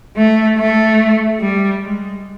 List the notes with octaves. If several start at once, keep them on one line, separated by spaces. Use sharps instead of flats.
A3
A3
G3
G#3